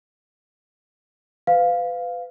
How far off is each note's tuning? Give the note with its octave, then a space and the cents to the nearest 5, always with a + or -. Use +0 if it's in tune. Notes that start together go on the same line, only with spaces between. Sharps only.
B4 +30 F5 +0